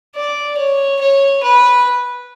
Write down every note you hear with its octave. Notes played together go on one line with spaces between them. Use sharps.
D5
C#5
C#5
B4